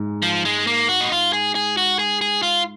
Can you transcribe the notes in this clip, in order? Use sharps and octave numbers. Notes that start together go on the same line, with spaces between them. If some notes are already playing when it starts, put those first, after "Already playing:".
Already playing: G#2
F3
G#3
A#3
F#4
D#4
F4
G#4
G#4
F#4
G#4
G#4
F4